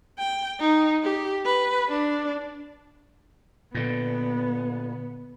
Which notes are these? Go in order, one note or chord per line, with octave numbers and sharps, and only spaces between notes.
G5
D#4
G4
B4
D4
A#2 D3 B3